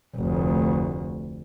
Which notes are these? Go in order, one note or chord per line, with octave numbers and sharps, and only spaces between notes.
F1 D2